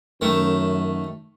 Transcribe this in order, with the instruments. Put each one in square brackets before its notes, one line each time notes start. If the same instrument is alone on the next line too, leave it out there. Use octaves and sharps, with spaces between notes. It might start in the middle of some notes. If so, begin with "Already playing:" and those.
[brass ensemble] F#2 [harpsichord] D#3 A3